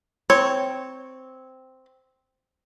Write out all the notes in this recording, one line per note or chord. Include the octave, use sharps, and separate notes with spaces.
C4 C#5